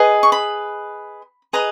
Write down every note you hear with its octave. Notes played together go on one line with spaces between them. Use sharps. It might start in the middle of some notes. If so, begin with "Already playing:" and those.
Already playing: G#4 B4 D#5
C#6
B5
G#4 B4 D#5 A#5